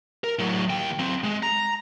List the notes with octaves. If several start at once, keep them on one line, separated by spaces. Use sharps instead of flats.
A#4
A2 F#3
D#2 G5
F#3 C4
G#3
A#5